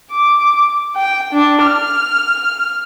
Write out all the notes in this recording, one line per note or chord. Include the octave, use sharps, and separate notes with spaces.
D6
G5
D4
F6